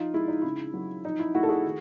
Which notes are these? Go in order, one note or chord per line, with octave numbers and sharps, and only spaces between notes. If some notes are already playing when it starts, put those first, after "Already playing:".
Already playing: F3 D#4 F4
G#3 E4
D#4
C#3 E4
F#3
F3 D#4
E4
A3 E4 F#4
A4
F#4 G#4
D#3